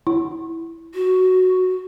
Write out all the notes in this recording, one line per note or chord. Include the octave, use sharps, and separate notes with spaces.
E4
F#4